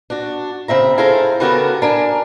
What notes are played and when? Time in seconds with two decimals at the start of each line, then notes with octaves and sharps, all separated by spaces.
0.10 D4 F#4
0.68 C#3 C4 E5 A#5
0.98 E4 G#4 A4 C5 F5 A#5
1.40 C#3 B3 F#4 G4 A4 A#4
1.82 D4 A#4 G#5